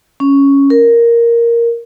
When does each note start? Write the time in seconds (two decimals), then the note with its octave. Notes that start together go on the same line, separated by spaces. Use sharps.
0.20 C#4
0.70 A#4